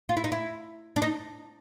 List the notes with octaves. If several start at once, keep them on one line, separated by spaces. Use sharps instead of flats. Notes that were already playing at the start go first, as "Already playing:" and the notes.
F4
E4
D#4
E4
D4
D#4